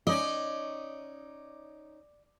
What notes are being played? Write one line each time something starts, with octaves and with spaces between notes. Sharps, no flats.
C#4 D#4 D5 D#5